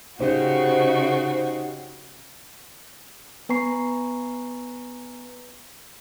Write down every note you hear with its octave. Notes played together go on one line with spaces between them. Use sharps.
C#3 D#4 F#4 G4 C5 D#5
B3 B4 G#5 A#5 C#6 C7